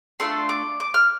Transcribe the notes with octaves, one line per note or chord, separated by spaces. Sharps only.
A3 D4 F4 A4 C6
D6
D6
F6